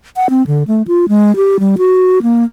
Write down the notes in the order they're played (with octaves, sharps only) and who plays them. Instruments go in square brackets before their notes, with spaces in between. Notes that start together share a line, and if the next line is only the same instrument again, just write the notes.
[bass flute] F#5
C4
D3
A3
F4
G#3
G4
G3
F#4
A#3